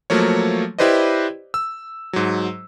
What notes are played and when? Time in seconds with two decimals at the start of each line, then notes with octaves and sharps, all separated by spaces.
0.10 F3 F#3 A3 A#3 C#5
0.79 E4 G4 B4 C5 D5 D#5
1.54 E6
2.13 G#2 F#3